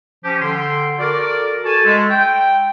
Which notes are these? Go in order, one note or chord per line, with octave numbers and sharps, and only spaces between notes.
F3 C#4 G4
D3 G5 C6
F#4 A4 A#4 D5
F#4 A4 G#5 A5
G#3 A3
G5